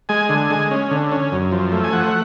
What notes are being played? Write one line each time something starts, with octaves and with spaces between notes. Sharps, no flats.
G#3 G#5
D3
G#3
C#4
D3
C#4
F#2
F3
A3
G#5
F3 F#5